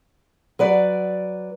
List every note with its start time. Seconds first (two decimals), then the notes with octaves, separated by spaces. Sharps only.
0.59 F#3 B4 D5